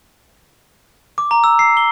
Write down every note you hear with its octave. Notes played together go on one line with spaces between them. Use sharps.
D6
A#5
E6
C7
G7